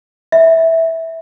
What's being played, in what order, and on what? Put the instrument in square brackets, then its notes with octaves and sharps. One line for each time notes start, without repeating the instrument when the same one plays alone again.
[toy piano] E5